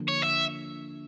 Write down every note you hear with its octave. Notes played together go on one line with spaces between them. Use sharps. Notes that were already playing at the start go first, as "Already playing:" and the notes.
Already playing: D3 F3 A#3 D4
C#5
E5